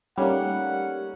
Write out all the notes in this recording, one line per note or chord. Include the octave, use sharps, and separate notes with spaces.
G3 A3 A#3 C#4 D#4 C#5 F#5